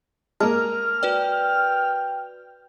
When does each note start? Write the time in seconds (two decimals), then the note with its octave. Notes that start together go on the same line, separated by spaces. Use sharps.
0.40 G#3 A#3 A#4 A5 F6
1.03 F#4 B4 D5 G5